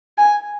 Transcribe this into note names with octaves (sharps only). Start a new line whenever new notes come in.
G#5